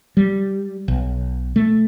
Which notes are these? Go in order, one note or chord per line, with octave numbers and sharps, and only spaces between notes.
G3
B1
A3